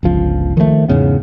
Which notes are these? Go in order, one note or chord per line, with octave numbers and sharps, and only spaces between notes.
G1 C#2 F3
D#3 F3 G3 A3
E2 G#2 C#3 B3